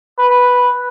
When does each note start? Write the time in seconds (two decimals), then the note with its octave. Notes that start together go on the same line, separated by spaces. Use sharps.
0.18 B4